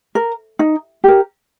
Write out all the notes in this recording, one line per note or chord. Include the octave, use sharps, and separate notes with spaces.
A#4
D#4
G4 A#4